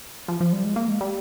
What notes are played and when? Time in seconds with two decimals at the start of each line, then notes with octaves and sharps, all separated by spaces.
0.28 F3
0.40 F3
0.53 G3
0.65 G#3
0.76 A#3
0.88 G#3
1.01 G3